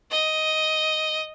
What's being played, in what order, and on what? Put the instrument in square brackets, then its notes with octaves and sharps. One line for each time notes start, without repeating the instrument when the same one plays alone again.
[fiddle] D#5